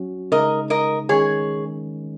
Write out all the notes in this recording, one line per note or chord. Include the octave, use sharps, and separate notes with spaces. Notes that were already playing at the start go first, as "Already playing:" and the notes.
Already playing: F#3 C#4 F#4
C#3 G#3 D#4 A#4 D#5
A#4 D#5
D#3 G#3 C#4 G#4 C#5